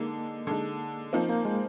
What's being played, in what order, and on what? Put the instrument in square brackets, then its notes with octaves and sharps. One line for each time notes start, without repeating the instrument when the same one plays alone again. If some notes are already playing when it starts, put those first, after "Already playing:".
Already playing: [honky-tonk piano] D3 G#3 D#4 [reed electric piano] A#3
[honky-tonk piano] D3 G#3 D#4
[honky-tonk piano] F3 C4 D#4 [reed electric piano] A#3
[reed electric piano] A#3
G#3